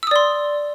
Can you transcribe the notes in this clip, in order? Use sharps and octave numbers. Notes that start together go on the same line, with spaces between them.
D5 C6 D#6 E6